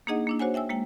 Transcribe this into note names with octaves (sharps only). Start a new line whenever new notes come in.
A#3 D4 D#4 G#4 D#5 F#5
A#3 D4 E4
F#4 C5 C#5 F#5 G#5
E5 G5 G#5 E6
G#3 A#3 G5